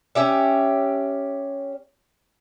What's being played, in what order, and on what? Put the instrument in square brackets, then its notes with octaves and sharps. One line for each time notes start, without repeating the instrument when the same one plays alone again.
[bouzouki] C#4 G4 E5